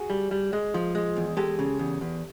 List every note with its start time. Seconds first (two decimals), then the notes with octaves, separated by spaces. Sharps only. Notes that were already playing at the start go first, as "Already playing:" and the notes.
Already playing: F#4 G#4
0.10 G3
0.31 G3
0.53 G#3
0.74 F3
0.95 G#3
1.16 E2
1.37 G#3 G4 A4
1.59 C#3
1.79 E2
2.01 E2